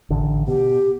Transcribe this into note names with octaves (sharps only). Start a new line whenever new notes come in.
A1 D3
B2 G4